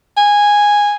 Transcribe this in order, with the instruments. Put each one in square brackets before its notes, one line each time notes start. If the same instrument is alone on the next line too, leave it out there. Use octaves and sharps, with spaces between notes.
[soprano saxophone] G#5